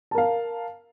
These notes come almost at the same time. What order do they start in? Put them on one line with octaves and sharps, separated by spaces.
A5 A#4 F5